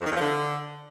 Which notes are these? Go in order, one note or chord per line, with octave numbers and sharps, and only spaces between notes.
F2
D#3
E2
F3
D3